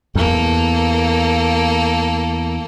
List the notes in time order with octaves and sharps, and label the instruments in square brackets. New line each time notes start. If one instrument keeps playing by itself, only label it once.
[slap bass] E2 [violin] A#3 A4